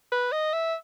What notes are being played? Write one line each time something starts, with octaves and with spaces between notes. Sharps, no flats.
B4
D#5
E5